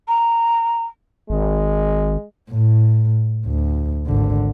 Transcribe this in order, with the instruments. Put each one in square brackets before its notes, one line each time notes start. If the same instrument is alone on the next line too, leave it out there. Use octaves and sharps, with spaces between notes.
[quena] A#5
[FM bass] G#1 [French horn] G#3
[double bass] A2
D2
G#1 D3